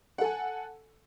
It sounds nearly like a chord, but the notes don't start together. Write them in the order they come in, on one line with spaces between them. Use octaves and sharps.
F#5 A4 G#5